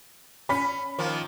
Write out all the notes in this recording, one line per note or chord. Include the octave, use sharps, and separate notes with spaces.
C#4 B5 B6
D#3 F3 A#3